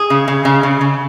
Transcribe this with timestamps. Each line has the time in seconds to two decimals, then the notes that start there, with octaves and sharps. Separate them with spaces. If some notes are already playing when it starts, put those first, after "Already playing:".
Already playing: G#4
0.10 C#3
0.28 C#3
0.45 C#3
0.63 C#3
0.81 C#3